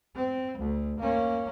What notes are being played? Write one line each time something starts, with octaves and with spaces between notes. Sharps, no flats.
C4
D2
A#3 C#4